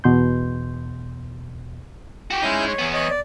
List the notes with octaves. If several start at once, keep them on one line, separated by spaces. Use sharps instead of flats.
E2 B2 C6 G6
F#4 G4
G#3 C#4 D#4 E4 G6
C#5
E2 B3
C#5 D#5
D5